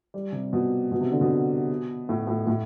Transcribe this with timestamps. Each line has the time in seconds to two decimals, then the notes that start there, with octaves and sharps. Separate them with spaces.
0.14 G3
0.32 C3
0.53 B2
0.91 B2
1.01 C3
1.11 D3
1.21 B2
2.09 A2
2.27 A2
2.47 A2